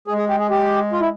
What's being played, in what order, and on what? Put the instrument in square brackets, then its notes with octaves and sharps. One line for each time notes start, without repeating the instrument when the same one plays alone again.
[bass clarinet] G#3 [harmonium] G#4
[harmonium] G#4
G4
G#4
G4
F4
E4